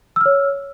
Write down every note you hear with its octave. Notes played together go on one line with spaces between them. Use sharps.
C#5 E6 F6